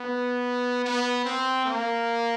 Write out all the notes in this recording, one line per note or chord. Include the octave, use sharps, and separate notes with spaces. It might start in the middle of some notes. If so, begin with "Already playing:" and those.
Already playing: B3
B3
C4
A#3